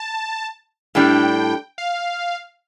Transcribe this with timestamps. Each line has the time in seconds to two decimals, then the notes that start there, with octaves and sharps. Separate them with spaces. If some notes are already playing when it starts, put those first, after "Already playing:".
Already playing: A5
0.95 A2 G3 D4 G5
1.78 F5